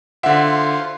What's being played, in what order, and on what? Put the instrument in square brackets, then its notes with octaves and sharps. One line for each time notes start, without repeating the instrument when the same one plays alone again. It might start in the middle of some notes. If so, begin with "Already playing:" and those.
[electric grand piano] D3 E5 [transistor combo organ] F4 C5 [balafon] F#5